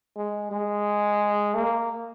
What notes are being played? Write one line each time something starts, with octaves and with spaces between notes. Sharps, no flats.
G#3
G#3
A#3